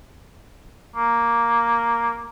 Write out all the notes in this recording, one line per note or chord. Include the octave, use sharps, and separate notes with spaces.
A#3